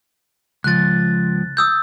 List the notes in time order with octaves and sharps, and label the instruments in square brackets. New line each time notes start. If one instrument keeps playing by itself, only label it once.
[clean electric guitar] C#2 F3 [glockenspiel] F#6 A6
[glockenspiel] D#6 E6 G6